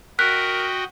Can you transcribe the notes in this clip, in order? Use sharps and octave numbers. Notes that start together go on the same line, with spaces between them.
F#4 A#4 D#5 G5 F#6 B6